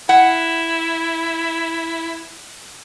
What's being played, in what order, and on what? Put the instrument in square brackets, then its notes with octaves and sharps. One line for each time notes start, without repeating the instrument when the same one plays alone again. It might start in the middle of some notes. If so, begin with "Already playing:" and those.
[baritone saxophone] E4 [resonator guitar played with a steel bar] F#5